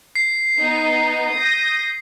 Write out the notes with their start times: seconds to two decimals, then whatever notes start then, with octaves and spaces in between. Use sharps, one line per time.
0.15 C7
0.61 B3 D#4
1.35 D#6 G6 A#6